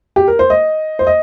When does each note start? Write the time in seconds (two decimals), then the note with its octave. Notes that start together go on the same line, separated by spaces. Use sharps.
0.16 G4
0.28 A#4
0.39 C5
0.50 D#5
0.99 C5
1.07 D#5